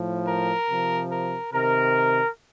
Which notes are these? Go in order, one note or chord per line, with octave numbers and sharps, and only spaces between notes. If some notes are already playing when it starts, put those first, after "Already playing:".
Already playing: A2 F3
A#4
C3 F3
A#4
C3 D#3 A#4